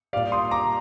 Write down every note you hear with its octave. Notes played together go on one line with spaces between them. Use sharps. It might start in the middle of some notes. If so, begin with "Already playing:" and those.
A#2 G3 D5 F5
C6 D#6
A#5 D6